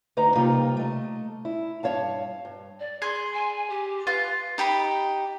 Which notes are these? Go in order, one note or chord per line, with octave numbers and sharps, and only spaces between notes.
D2 D#4 B4 D#5 A#5
C3 G3 A#3 D#4 F4
A3 D#5
E4
G2 D#3 C#5 F5 A5
G2
D5
G#4 C6
G#5
G4
F4 B4
D#4 G4 B5 D#6